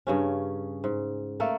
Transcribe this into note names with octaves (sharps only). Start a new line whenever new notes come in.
G2 C#3 C#4
G#2
A3 A#3 A4